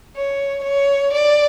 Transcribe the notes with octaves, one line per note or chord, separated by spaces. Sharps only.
C#5
C#5
D5